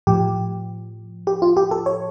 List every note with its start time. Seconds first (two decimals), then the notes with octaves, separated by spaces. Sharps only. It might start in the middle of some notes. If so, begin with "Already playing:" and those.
0.07 A2 F3 G4
1.27 G4
1.42 F4
1.57 G4
1.71 A4
1.86 C#5